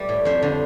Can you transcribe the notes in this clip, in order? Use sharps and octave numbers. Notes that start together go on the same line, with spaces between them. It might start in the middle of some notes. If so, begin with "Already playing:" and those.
Already playing: G3 A3 B4 D5
A2
F2 C5 E5
D3